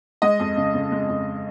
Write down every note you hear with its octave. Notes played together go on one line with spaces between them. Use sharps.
G#3 D#5
F2
C#3
C#3
G#3
F2